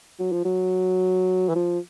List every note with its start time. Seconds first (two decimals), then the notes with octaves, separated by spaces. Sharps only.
0.20 F#3
0.32 F3
0.45 F#3
1.49 E3
1.55 F3